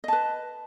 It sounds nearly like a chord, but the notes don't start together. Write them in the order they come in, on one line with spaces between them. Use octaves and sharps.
D#5 A5 B4